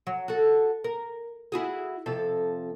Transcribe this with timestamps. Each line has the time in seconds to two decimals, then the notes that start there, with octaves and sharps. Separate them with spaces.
0.07 F#3
0.28 F#4 A4
0.84 A#4
1.52 E4 F#4 G#4
2.06 F2 C3 A4